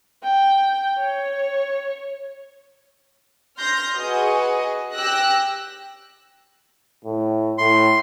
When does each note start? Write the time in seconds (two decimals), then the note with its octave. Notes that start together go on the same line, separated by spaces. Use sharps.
0.23 G5
0.99 C#5
3.58 C6 F6 G6 A#6
3.95 F#4 G#4 B4 D#5
4.93 G4 G5 E6 F#6 A#6
7.05 A2
7.58 A2 C6